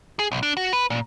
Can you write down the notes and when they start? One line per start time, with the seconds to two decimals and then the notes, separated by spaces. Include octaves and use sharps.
0.19 G#4
0.32 B1
0.43 D4
0.57 F#4
0.73 B4
0.90 A#2